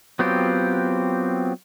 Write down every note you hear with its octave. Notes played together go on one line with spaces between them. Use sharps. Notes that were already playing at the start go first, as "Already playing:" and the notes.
F#3 B3 C4 F4 G4